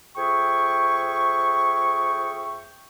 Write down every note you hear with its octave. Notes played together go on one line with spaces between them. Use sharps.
F2 G#4 E5 G5 C#6